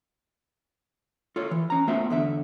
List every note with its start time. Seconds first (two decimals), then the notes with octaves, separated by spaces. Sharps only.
1.36 F4 A4 C#5
1.51 E3
1.70 C#4 A#5
1.87 A3 B3 F4 F#4 C5 E5
2.10 E2 D3 E5